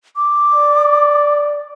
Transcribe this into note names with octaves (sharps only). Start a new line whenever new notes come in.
D6
D5